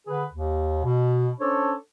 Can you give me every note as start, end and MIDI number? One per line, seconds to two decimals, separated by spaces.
0.07 0.24 50
0.07 0.24 68
0.07 0.24 71
0.33 0.82 39
0.83 1.30 47
1.40 1.73 61
1.40 1.73 62
1.40 1.73 69
1.40 1.73 72
1.40 1.73 73